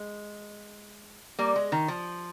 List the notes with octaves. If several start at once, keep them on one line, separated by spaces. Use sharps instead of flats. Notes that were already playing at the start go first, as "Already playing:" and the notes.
Already playing: G#3
G3 A#3
G#3
D#3
F3